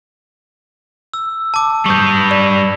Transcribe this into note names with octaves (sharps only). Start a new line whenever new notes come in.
E6
A5 D6
G3 B4 C#6 D#6 G6
D5